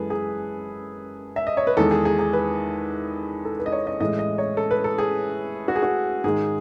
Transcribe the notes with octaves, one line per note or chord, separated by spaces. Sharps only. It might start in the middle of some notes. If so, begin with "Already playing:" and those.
Already playing: F#2 E3 G#3 G#4 A4 B4
G#4
E5
D#5
C#5
B4
E2 D#3 G#3 A4
G#4
G#4
G#4
B4
A4
B4
D#5
C#5
D#5
A2 E3 G#3 D#5
D#5
C#5
A4
B4
A4
G#4
F#4
G#4
F#4
G#2 D#3 G#3 G#4